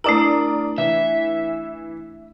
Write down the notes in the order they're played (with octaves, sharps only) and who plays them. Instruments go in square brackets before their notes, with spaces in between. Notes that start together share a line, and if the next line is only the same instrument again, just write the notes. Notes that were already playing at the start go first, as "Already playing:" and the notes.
[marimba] A3 D4 E4 [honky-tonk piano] A#4 D5 D#6
[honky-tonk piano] E3 [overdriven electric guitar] E5